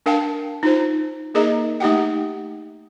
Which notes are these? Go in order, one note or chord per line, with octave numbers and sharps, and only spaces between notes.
D4 A#4 F5 G5 A5
D#4 F4 C5
A#3 D#4 G#4 A#4 D#5 A#5
A3 D#4 G4 F#5 G5